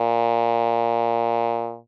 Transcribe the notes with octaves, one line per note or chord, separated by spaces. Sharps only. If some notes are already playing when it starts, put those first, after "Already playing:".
Already playing: A#2